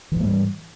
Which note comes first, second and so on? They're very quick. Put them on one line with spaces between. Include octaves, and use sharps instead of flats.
E3 G#2 A3 G3